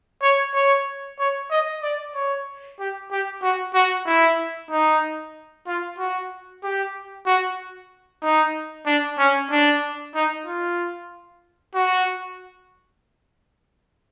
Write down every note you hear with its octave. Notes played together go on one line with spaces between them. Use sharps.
C#5
C#5
C#5
D#5
D5
C#5
G4
G4
F#4
F#4
E4
D#4
F4
F#4
G4
F#4
D#4
D4
C#4
D4
D#4
F4
F#4